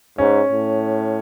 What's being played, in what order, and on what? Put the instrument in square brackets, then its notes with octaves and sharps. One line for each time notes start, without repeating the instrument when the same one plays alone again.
[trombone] G#2 [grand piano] C#4
[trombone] A2